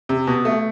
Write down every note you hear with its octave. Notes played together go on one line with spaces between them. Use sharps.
C3
B2
A3